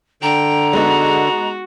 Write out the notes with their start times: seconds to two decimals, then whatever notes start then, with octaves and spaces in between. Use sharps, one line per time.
0.22 D3 G5 A#5
0.73 G#3 B3 D#4 F#4